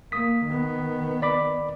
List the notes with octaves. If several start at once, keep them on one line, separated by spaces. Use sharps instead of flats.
A#3 D#6 B6
D#3 B3
D5 B5 D6